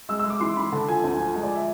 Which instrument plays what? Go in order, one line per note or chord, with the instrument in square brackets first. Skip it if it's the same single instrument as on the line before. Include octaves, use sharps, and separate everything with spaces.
[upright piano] G#3 E6
E6
G#3
D6
E3 C6
E3 B5
D3 A5
F3 G#5
D2
F3
G#3
D5
E5